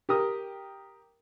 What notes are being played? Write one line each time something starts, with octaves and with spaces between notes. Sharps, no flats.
G4 A#4 D#6